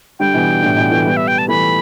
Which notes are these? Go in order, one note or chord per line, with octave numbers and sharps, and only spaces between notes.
D3 G3 G5
B2 E3
A2 D3
B2 E3
E3 A3
G3 B3
E5
G5
A5
E3 A3 B5